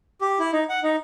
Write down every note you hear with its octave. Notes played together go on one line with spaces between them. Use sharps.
G4
E4
D#4
F#5
D#4